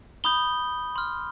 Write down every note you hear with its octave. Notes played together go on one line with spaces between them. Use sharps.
B5 D#6 G6 G7
C6 F6